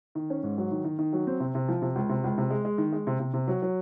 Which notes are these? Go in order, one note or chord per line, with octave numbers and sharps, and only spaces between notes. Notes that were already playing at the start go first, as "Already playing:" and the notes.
D#3
C#4
G#2
F#3
D#3
D#3
D#3
F#3
C4
C3
C3
F3
C3
C#2
C3
C#2
C3
G#3
G#3
D#3
G#3
C3
C3
C3
F#3
F#3